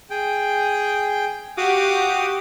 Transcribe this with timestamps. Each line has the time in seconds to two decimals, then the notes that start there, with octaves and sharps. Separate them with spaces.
0.10 G#4 G5
1.57 F#4 G4 F5 D6 D#6